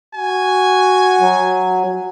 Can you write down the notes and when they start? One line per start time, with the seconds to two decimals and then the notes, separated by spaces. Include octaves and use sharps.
0.15 F#4 G#5
1.21 F#3